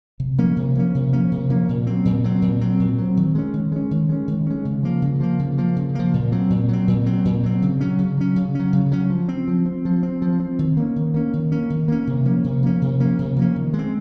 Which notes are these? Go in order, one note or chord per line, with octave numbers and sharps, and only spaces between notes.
C3
F3 A#3 C#4
C3
F3 A#3 C#4
C3
F3 A#3 C#4
C3
F3 A#3 C#4
A#2
F#3 C4
A#2
F#3 C4
A#2
F#3 C4
A#2
F#3 C4
D#3
G#3 C#4
D#3
G#3 C#4
D#3
G#3 C#4
D#3
G#3 C#4
C#3
F3 A#3
C#3
F3 A#3
C#3
F3 A#3
C#3
F3 A#3
A#2
F#3 C4
A#2
F#3 C4
A#2
F#3 C4
A#2
F#3 C4
C#3
F#3 C#4
C#3
F#3 C#4
C#3
F#3 C#4
C#3
F#3 C#4
F3
C4
F3
C4
F3
C4
F3
C4
D#3
A#3 C#4
D#3
A#3 C#4
D#3
A#3 C#4
D#3
A#3 C#4
C3
F3 A#3 C#4
C3
F3 A#3 C#4
C3
F3 A#3 C#4
C3
F3 A#3 C#4
D#3
G#3
C4